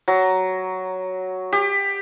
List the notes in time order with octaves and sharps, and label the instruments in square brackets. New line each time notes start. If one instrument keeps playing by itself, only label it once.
[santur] F#3
G4